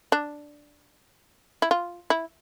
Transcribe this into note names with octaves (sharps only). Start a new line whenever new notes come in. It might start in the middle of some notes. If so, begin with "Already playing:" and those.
D4
E4
F4
E4